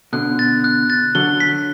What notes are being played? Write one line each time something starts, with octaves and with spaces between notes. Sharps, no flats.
B2 D3 F#6
A6
F#6
A6
D3 F#3 G7
B6